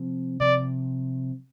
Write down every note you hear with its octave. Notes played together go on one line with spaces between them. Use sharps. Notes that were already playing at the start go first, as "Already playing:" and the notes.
Already playing: C3 F3 C4
C3 F3 C4 D5